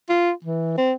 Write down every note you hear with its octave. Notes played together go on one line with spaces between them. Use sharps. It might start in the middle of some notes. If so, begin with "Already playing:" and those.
F4
E3
C4